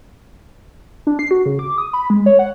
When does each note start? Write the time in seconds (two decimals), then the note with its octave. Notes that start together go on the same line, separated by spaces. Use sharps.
1.07 D4
1.19 C7
1.31 F#4
1.46 C#3
1.59 D6
1.78 D#6
1.93 B5
2.10 G#3
2.26 C#5
2.39 F#5